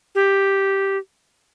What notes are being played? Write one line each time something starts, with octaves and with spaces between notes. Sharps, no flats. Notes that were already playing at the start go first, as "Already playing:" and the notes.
G4